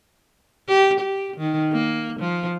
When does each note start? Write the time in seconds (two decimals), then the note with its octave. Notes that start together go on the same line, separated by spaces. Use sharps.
0.68 G4
1.00 G4
1.37 D#3
1.72 A#3
2.20 F3